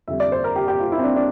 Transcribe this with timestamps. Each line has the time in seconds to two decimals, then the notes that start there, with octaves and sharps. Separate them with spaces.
0.08 F2 D3 G3 E5
0.20 D5
0.32 C5
0.44 A#4
0.56 G4
0.68 G4
0.80 F4
0.92 E4
0.99 C4
1.04 D4
1.16 D4